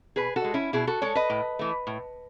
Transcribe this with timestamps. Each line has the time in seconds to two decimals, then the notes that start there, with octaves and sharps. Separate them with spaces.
0.16 B2 G#4 B4
0.36 F#4 A4
0.44 G#3
0.54 C#4 E4
0.73 B2 E4 G#4
0.87 F#4 A4
1.02 G#3 A4 C#5
1.15 B4 D#5
1.30 A2
1.59 E3 A3
1.87 A2